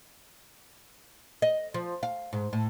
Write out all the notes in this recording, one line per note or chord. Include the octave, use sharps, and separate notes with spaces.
D#5
F3
F5
G#2
A2